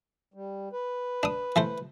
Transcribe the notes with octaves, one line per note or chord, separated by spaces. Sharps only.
G3
B4
D4 D#6
E3 A3 C5